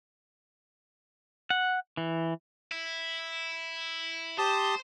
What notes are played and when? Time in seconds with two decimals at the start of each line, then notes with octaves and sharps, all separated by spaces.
1.50 F#5
1.97 E3
2.71 E4
4.38 G4 C5 A5 D#6